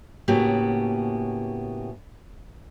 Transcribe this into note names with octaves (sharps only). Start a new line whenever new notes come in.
A2 C#3 A#3 B3 F#4 G4